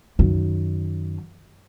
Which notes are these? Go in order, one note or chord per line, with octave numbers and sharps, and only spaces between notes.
F#2 D#3